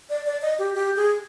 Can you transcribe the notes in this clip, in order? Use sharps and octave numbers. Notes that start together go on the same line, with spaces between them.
D5
D5
D#5
G4
G4
G#4